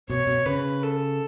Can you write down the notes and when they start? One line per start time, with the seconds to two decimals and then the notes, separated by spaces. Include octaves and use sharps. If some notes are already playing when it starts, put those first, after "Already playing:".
0.09 B2 C#5
0.27 B2
0.46 C#3 B4
0.83 A4